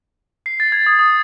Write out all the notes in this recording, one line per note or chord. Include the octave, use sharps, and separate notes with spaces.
C7
A6
G#6
D#6
D#6